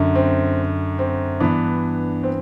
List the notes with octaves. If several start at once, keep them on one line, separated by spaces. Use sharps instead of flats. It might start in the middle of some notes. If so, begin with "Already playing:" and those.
Already playing: F#2 D3
C4
C4
G2 E3 B3 D4
C4